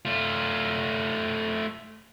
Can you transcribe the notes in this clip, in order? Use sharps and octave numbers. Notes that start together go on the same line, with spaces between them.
A3 F4